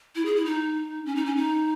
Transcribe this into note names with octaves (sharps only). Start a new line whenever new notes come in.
E4
G#4
E4
D#4
C#4
D#4
C#4
D#4